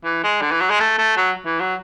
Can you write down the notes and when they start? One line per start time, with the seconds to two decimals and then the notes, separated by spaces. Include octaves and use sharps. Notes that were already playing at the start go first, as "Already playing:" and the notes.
0.04 E3
0.24 G#3
0.41 D3
0.51 E3
0.61 F#3
0.70 G#3
0.80 A3
0.98 A3
1.16 F#3
1.45 E3
1.60 F#3